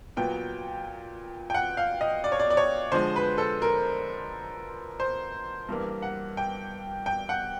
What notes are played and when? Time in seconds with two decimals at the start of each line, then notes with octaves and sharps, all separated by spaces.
0.17 A#2 F#3 B3 G5
1.50 G5
1.54 F#5
1.77 F5
2.01 D#5
2.24 D5
2.32 C#5
2.40 D5
2.50 D5
2.57 C#5
2.92 D3 F3 G#3 C5
3.16 B4
3.38 A4
3.62 A#4
5.00 C5
5.69 G2 E3 G3 A#3
6.02 F#5
6.37 G5
7.06 G5
7.29 F#5